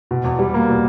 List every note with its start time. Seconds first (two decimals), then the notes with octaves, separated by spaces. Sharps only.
0.11 B2
0.24 E2
0.39 G3
0.54 A#3
0.69 B2